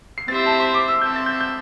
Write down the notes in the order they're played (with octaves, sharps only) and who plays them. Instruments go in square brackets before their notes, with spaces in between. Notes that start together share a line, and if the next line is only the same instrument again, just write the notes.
[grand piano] C7
[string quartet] C4 E4 G4 C5 E5 [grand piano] A6
[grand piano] A5
C6
D6
E6
[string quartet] C4 A4 E5 [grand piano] G6
[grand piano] A6
G6
G6